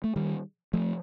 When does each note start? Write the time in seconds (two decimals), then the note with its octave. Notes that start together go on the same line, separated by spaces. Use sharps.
0.04 A3
0.16 D#3 G3
0.74 F3 A3